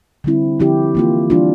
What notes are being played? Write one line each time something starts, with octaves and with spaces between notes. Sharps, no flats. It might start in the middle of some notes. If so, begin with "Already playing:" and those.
D3 G3 C4 E4
D3 F3 C4 E4 G4
E3 A#3 F4
E3 G3 D4 F4